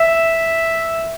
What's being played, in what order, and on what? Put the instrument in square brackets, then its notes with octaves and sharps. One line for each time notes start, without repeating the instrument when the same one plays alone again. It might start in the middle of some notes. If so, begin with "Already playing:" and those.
Already playing: [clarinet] E5